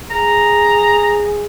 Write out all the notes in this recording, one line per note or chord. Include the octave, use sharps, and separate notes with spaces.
G#4 A#5